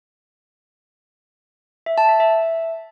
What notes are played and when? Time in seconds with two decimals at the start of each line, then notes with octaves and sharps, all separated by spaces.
1.86 E5
1.98 A5
2.09 E5
2.20 E5